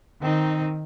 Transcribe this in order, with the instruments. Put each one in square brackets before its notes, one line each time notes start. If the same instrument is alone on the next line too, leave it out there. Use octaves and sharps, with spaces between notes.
[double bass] D#3 [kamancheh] C4 D#4